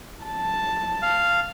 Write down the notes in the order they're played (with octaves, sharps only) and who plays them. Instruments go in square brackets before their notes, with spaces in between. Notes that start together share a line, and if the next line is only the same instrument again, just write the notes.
[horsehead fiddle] A5
[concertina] F5